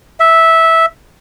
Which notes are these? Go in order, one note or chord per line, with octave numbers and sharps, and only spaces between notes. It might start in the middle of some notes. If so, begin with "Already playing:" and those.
E5